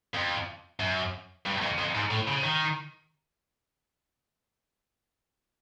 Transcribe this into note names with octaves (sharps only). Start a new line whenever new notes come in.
F2
F#2
G2
F2
F2
G#2
A2
C#3
D#3